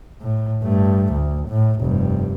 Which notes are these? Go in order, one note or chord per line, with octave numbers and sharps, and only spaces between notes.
A2
G2 A3
D2
A2
F1 G2